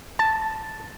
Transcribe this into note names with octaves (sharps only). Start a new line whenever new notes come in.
A5